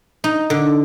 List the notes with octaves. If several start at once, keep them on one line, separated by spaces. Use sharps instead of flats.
D#4
D3